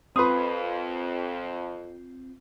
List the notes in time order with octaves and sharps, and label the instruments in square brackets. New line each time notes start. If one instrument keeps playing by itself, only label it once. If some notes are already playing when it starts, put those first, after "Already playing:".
[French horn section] F2 [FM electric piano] C4 F4 [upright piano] B4 C6 D#6